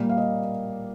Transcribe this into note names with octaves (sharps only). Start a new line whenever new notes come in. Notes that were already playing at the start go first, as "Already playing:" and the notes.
Already playing: A#2 G3 A#3 D5
F5
D#5